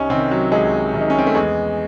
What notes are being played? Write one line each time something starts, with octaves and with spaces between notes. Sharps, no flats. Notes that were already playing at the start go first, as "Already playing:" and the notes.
Already playing: C2 C#4 D#4
C3 D#3 C4
F#3
C2 G#3
C3 D#3
D#4
C#4
C4
A3
E2 G#3